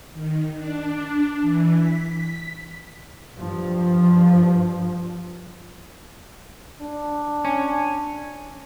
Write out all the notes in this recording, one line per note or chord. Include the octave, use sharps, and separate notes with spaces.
D#3
D4
E3
B6
G2 F3
D4
C#4